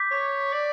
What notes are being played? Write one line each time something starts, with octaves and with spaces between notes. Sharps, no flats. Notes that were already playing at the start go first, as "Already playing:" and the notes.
Already playing: D6 G6 B6
C#5
D5